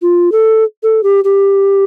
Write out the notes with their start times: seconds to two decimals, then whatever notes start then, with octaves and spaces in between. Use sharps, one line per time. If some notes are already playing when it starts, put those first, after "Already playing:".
0.02 F4
0.32 A4
0.83 A4
1.03 G4
1.24 G4